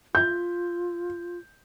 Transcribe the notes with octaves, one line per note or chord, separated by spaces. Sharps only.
F4 G6